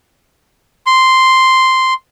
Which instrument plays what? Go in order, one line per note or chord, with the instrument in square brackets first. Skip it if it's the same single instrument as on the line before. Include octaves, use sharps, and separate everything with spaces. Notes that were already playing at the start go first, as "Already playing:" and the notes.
[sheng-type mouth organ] C6